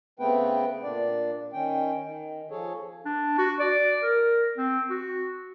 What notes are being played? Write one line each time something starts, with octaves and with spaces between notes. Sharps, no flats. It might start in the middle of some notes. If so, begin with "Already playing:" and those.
C#3 A3 B3 C4 B4 G5
A#2 D4 D5
D#3 C#4 G5
D#3
F3 G#4 A4 C#5
D4
F#4
D5
A#4
C4
F#4